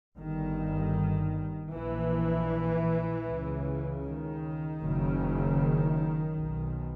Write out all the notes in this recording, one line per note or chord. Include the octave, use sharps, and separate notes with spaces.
G1 G2 D#3
A#1 A#2 E3
C#2 C#3
D#3
F#1 F#2 C#3
B1 B2